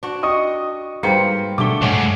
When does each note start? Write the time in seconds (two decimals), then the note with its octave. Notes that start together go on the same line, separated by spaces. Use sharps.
0.03 D4 F#4
0.23 D#5 G5 C#6 D#6
1.03 G#2 G3 A#3 B4 F5 G5 C#7
1.58 B2 D3 F#3 G3 A3 D6 G7
1.82 B1 G#2 C#4 D#5 F#5